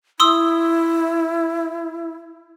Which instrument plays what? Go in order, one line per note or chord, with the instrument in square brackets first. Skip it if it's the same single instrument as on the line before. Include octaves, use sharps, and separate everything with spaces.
[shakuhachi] E4 [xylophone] C6 D#6 E6